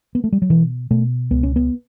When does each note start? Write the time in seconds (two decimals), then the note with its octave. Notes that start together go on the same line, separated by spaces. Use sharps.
0.15 B3
0.24 A3
0.32 G3
0.42 F#3
0.50 B2 E3
0.90 B2 A3
1.31 C#2 B3
1.43 C#4
1.56 B3